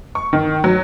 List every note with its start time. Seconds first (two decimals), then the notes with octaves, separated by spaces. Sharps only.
0.15 C#6
0.33 D#3
0.64 F#3